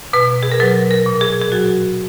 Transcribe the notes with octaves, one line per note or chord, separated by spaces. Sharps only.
B2 B4
G#4
A#4
F#3 B4
A#4
A#2
G#4
G#4
F#3 F#4